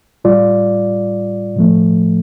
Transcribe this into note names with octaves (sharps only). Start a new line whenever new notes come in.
A2 G3 F4 D5
A2 F3 A3